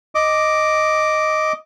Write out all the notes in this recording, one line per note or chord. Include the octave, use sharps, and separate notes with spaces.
D#5 D6